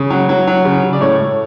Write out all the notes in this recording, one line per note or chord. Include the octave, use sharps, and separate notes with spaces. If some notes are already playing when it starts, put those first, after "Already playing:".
Already playing: C#3
F#3
F#3
F#3
C#3
C#3
D5
A2 C#5
A2